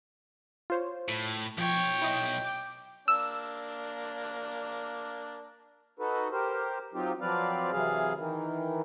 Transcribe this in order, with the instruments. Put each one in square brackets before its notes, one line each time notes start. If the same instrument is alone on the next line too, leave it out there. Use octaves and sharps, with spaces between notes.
[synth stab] F4 C5 C#5
[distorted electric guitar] A2
[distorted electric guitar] B1 C#5 [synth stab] F3 [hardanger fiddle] G5
[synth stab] E4 D#5
D6 G6
[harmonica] A#3 D4 [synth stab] E6
[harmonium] D#4 F#4 A4 B4
G4 A#4 C5
F#3 C4 D#4 F4 G4
F3 F#3 C4 B4 D5 F5
C3 E3 F#3 G#4 F5
D#3 E3